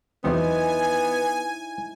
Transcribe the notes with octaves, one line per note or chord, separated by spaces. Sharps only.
E2 F#3 B3 C4 D#4 E4 C5 G#5